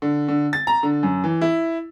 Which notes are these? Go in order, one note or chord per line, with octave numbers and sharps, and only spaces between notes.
D3
D3
A6
A#5
D3
F#2
E3
E4